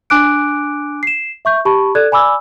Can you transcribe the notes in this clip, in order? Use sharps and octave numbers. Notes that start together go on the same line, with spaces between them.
D4 G#5 D6 F#6 D7
C7 E7
E5 C#6 G6
G4 A5 B5 C#6
A4 D5 F#6 G#6
D5 G#5 B5 D6 E6